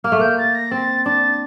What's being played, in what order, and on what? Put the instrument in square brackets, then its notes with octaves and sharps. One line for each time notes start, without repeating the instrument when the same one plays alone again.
[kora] A#3 [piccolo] F6
[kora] A3
[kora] A#3 [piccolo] G6
[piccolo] A6
A#6
[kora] C4 [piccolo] A6
[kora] D4 [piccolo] A6